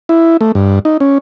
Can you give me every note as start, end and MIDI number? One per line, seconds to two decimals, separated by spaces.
0.09 0.37 64
0.41 0.52 57
0.55 0.79 43
0.85 0.97 63
1.00 1.18 61